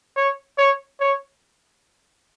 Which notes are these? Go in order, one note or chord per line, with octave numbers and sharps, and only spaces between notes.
C#5
C#5
C#5